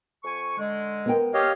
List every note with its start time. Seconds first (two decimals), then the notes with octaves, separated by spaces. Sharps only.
0.24 F2 G#5 C#6
0.58 D3 G#3
1.06 B3 A#4 G5
1.34 G4 C#5 D#5 F5